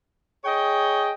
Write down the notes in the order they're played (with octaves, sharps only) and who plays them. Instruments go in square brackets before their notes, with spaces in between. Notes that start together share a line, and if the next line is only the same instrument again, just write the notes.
[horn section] G#4 C#5 D#5 G5